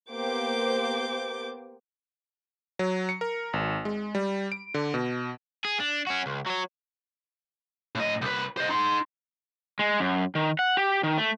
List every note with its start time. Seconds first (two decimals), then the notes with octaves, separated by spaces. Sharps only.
0.11 A#3 B3 G4 C5 D6 G6
2.79 F#3
3.09 C#7
3.21 A#4
3.53 G#1
3.85 G#3
4.15 G3
4.52 D7
4.74 D3
4.94 B2
5.65 G#4
5.80 D4
6.07 C#4 F#4
6.26 C#2
6.46 F#3 C#5
7.95 A2 D#5
8.22 C2 B4
8.57 C5 D#5
8.69 D#4 C6
9.79 G#3
10.00 F#2
10.35 D#3
10.59 F#5
10.77 G4
11.03 D#3
11.18 A3